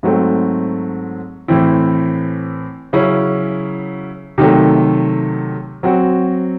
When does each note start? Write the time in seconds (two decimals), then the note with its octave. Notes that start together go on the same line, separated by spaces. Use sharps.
0.03 G#2 F#3 A3 C4
1.48 A2 E3 C4 E4
2.93 C#3 F#3 C#4 E4
4.38 C3 D#3 F#3 A3
5.83 F#3 C4 F#4